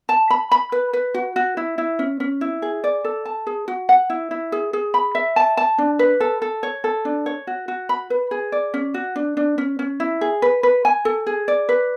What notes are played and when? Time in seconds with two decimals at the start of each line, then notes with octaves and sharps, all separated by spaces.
0.09 A5
0.30 B5
0.52 B5
0.72 B4
0.93 B4
1.14 F#4
1.36 F#4
1.57 E4
1.78 E4
1.99 C#4
2.20 C#4
2.41 E4
2.62 G#4
2.84 D5
3.05 A4
3.25 A5
3.47 G#4
3.68 F#4
3.89 F#5
4.10 E4
4.31 E4
4.52 G#4
4.73 G#4
4.94 B5
5.15 E5
5.36 A5
5.57 A5
5.78 D4
5.99 B4
6.20 A4
6.42 A4
6.63 C#5
6.84 A4
7.05 D4
7.26 C#5
7.47 F#4
7.68 F#4
7.89 B5
8.10 B4
8.31 G#4
8.52 D5
8.74 C#4
8.94 F#4
9.16 D4
9.37 D4
9.58 C#4
9.79 C#4
10.00 E4
10.21 G#4
10.42 B4
10.63 B4
10.85 G#5
11.05 A4
11.27 G#4
11.48 D5
11.69 B4